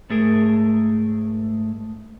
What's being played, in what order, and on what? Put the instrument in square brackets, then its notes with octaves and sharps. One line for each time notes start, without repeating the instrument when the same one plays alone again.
[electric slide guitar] G#2 A3 G#4 A#4